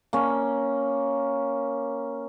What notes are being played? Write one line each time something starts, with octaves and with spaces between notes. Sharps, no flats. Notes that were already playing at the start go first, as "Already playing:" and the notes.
A#3 C#4